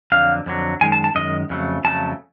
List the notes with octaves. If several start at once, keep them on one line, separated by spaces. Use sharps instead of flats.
F2 D3 F#3 F5
F2 D3 F#3
F#2 D#3 G#3 G#5
A5
A5
F#2 D#3 G#3 D#5
F2 C#3 F#3 A3
F2 C#3 F#3 A3 A5